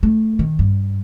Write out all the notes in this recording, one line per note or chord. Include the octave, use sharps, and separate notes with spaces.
A3
D#3
G2